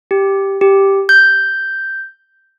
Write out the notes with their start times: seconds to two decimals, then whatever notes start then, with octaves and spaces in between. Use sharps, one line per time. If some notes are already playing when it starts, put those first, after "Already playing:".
0.11 G4
0.61 G4
1.09 G6